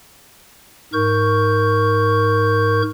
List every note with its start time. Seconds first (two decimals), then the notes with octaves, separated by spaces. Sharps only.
0.93 G#2 A#4 C#6 G6